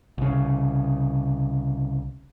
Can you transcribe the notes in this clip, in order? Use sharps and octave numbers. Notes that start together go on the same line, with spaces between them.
C2 C#3